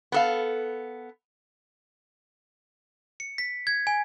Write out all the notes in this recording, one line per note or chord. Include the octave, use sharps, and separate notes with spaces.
B3 A4 F5
C#7
B6
G#6
G#5